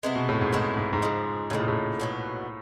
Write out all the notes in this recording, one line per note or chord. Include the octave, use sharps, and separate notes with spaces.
C3 G#3 B3 E4
B2
A2
G#2
A2 G#3 B3 E4
G#2
G#2
C#3 F3 G#3
A2 C#3 F3 G#3
A#2
A2
B2 F#3 B3